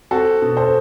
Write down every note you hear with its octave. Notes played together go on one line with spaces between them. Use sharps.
C4 F#4 A4
B2
A4 C5